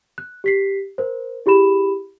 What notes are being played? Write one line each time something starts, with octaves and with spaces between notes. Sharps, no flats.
F#6
G4 B6 C7
A#4 C5
E4 G4 G#4 B5 E7